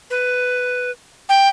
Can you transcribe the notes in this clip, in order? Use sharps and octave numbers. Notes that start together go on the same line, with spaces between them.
B4
G5